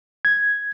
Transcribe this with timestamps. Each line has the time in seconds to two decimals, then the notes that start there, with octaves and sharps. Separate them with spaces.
0.25 G#6